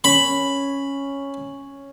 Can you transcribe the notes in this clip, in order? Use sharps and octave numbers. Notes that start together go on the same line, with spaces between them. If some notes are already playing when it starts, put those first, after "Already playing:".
C#4 B5